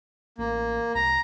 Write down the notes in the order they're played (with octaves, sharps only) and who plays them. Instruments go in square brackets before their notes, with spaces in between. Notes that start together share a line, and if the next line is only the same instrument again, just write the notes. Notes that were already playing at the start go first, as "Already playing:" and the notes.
[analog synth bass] A1 [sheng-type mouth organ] A#3
[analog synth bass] C2 [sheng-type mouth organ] A#5